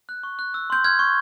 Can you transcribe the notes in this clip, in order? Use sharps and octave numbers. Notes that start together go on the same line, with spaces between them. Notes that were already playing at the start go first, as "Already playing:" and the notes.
F#6
C#6
F#6
E6
C6 G6
F6 G#6
C#6